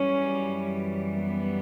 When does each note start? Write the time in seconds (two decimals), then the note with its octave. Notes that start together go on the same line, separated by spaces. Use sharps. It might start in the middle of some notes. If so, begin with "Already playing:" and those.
Already playing: F#2 E3 G3 C#4
1.14 B3